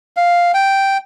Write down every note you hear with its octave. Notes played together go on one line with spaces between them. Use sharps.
F5
G5